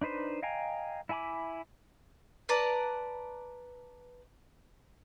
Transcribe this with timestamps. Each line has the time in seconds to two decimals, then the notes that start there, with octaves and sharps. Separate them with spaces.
0.01 D4 D#4 B4 C5 D#5
0.43 D#5 F5 G5 G#5 A#5
1.09 E4 E5 G#5 B5 D6
2.49 B4 D5 A5 A#5